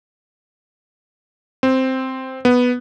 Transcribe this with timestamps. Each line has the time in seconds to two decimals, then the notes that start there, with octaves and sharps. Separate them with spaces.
1.63 C4
2.45 B3